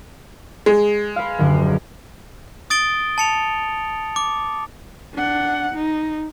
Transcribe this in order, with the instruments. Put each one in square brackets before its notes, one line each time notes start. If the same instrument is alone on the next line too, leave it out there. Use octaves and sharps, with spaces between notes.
[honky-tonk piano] G#3
[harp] B4 F5
D#1 F#2 D3
[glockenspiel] D#6 A6 D7 G7
A5 C#7 F7
D6
[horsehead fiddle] D4 F#5
D#4